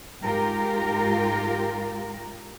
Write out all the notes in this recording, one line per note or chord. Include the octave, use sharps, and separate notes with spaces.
G#2 G#3 F4 G4 A#4